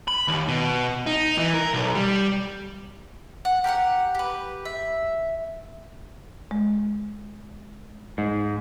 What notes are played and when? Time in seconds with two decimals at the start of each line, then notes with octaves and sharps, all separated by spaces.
0.08 B5
0.28 D#2
0.48 B2
1.06 D#4
1.38 E3
1.54 A#4
1.73 B1
1.95 G3
3.45 F#5
3.64 G4 A#4 F5 F#5
4.15 G4 B4
4.65 E5
6.51 G#3
8.18 G#2